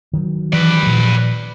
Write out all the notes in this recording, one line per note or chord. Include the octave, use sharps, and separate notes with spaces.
D#3 F#3
E3 B4 D5
A#2 F3